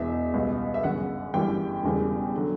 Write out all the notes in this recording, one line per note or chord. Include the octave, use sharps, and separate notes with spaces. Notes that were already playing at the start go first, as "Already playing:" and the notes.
Already playing: E1 E2 B2 E5
C#2 B2 G3
E5
G1 F#2 C#3 F#5
G1 F#2 E3 G3 G5
E1 E2 C#3 G3
D3 F#3